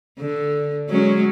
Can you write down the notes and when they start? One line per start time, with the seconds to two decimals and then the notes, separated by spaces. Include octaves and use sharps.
0.20 D3
0.89 F#3 G#3 C#4